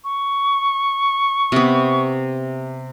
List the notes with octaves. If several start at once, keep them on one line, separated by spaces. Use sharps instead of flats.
C#6
C3 B3